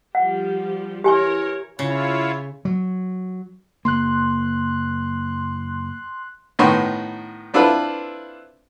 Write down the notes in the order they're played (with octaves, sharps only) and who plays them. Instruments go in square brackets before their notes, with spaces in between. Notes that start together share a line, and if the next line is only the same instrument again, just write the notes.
[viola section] F3 G3 G4 [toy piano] F#5
[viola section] E3 A#4 C#5 [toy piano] G4 G#5 C#6
[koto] C#3 [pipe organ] E4 F4 C#5
[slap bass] F#3
[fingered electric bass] F#1 A#3 [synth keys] C6 F#6
[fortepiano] A2 D#3 B3 C6 C#6
C4 D4 E4 F4 A4 B4